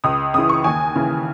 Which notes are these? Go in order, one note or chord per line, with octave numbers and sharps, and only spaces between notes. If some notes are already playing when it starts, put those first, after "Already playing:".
C#2 D#6
C#3 E3 D#6
C#6
D#2 G#5
C#3 E3